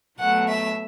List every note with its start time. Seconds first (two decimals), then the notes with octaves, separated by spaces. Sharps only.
0.18 B2 F#3 A3 F#5
0.47 E5